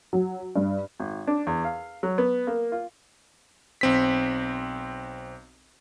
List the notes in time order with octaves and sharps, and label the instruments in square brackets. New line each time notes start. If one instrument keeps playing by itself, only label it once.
[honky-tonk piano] F#3
G2
[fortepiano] G#1
D4
E2
F5
F#3
B3
A#3
F4
[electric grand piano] B1 C4 B6